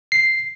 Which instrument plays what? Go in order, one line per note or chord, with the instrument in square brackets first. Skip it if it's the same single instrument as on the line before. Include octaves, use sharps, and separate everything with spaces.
[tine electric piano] C7